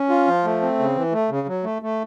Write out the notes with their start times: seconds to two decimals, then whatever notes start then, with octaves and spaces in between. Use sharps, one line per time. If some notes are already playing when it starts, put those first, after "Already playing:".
Already playing: C#4
0.09 F4
0.27 F3
0.45 A3
0.61 C4
0.79 C#3
0.96 E3
1.12 A3
1.30 C#3
1.47 F#3
1.64 A3
1.82 A3